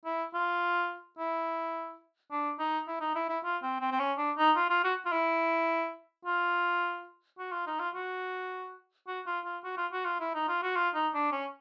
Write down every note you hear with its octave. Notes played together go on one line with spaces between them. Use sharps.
E4
F4
E4
D4
D#4
E4
D#4
E4
E4
F4
C4
C4
C4
C#4
D4
D#4
F4
F4
F#4
F4
E4
F4
F#4
F4
D#4
F4
F#4
F#4
F4
F4
F#4
F4
F#4
F4
E4
D#4
F4
F#4
F4
D#4
D4
C#4